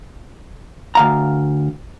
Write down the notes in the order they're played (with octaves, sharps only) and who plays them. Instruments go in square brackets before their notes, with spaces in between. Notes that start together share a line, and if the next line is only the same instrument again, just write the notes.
[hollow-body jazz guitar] D2 F5 A#5